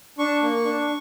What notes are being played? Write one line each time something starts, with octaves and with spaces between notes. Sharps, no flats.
D4 C#6
A#3
D4